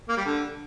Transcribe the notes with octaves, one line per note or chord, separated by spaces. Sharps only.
A#3
G3
D3